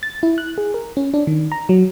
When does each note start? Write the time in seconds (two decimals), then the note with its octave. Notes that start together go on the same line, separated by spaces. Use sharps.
0.03 A6
0.23 E4
0.38 F#6
0.58 G#4
0.74 A#4
0.97 C#4
1.14 D4
1.27 D#3
1.52 A#5
1.69 F#3